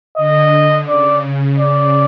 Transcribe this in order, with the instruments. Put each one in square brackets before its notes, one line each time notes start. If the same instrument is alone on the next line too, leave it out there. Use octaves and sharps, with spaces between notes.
[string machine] D3 [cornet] D#5
[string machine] D3
[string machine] C#3 [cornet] D5
[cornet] D5